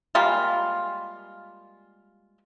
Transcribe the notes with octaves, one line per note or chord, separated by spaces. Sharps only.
G3 G#3 A#3 F4